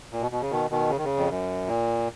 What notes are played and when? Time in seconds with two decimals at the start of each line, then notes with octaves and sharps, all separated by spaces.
0.12 A#2
0.21 B2
0.31 B2
0.41 C#3
0.51 B2 D#3
0.71 B2 D#3
0.90 C#3
0.98 D#3
1.04 C#3
1.17 F2
1.28 F#2
1.67 A#2